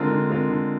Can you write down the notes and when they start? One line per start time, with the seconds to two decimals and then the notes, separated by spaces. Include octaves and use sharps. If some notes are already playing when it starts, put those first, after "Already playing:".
Already playing: D3 G#3 C4 F4 A#4
0.11 D3
0.30 G#3 C4 F4 A#4
0.50 D3